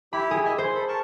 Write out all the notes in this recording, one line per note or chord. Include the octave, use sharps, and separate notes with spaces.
E4 G4 B5
G#4
D#5 E5 G#5
C5 C6
A4 B5
A#4 A5 C#6